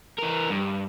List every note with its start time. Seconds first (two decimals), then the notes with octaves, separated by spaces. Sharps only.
0.18 E3 A#4
0.50 G2